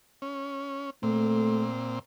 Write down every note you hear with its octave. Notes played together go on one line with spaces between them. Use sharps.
C#4
A#2 A3 C4